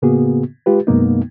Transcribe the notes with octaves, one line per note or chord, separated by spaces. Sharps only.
A2 C#3 A#3 B3 F#4 G#4
G#3 F4 G4 B4
F#2 B2 G#3 A#3 B3 D#4